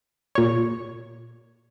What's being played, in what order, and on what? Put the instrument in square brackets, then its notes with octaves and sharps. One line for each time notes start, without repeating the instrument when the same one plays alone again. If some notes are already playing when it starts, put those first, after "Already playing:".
[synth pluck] A#2 C#5